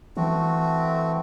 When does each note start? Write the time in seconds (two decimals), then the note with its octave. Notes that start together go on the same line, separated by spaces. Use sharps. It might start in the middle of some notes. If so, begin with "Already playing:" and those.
0.17 E3 A3 C4 F#4